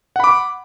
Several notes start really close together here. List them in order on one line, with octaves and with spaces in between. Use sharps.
F#5 B5 D6